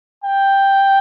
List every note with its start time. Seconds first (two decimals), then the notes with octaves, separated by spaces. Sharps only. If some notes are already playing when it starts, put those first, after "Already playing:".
0.24 G5